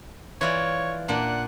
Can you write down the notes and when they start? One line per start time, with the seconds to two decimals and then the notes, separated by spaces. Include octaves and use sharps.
0.41 E3 F4 C#5 D5
1.08 A#2 D4 F#5